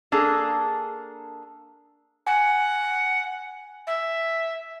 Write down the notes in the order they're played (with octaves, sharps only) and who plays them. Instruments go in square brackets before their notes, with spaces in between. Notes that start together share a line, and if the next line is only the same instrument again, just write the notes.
[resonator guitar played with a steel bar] A#3 D4 G#4 A4
[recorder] F#5 [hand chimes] G#5
[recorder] E5